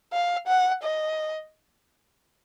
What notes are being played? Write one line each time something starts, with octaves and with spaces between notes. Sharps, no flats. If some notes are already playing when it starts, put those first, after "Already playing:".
F5
F#5
D#5